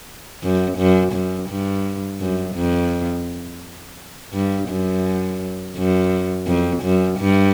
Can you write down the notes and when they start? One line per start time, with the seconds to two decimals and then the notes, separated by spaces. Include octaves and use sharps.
0.43 F#2
0.78 F#2
1.13 F#2
1.49 G2
2.20 F#2
2.55 F2
4.33 G2
4.69 F#2
5.76 F#2
6.47 F2
6.83 F#2
7.19 G2